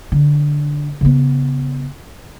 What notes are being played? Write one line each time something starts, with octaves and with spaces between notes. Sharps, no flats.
D3
C#3 B3